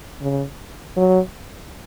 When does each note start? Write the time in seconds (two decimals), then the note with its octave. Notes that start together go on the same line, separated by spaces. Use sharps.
0.21 C#3
0.97 F#3